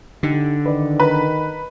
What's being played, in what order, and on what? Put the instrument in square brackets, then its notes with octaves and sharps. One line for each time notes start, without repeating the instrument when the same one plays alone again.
[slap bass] D3 [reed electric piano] D#4 G4
[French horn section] D#3 [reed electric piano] B4 D5
[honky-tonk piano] B4 [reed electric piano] A#5